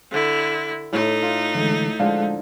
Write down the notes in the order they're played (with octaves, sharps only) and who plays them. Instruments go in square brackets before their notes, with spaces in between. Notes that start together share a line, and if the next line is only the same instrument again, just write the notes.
[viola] D3 E4
[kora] A2 [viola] A3 D#4
[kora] F4
[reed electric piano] D3 E3 G#3
[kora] D3 F3 [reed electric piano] G#3 F5